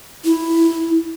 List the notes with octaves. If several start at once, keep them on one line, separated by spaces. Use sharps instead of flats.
E4